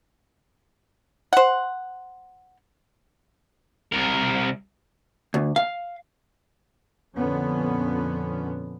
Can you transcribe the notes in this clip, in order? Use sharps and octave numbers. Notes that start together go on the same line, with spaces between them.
C5 F#5
C2 A#4
D2
F5
F2 A#2 D3 F3 B3 C#4